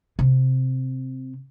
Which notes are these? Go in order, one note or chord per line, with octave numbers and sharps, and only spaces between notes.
C3